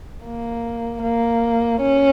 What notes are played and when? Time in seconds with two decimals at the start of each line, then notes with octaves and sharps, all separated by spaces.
0.25 A#3
1.02 A#3
1.81 C#4